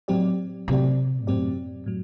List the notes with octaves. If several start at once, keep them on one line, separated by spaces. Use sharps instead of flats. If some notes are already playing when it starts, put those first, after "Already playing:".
A2 F#3 C4 G4 D5
A2 C3 F#3 C4 G4 D5
F#2 A2 F#3 C4 G4 D5
A2 F#3